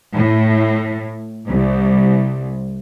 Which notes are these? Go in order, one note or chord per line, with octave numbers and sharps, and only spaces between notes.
A2
C2